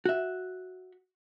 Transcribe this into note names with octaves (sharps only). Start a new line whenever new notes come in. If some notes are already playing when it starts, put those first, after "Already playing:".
F#4 E5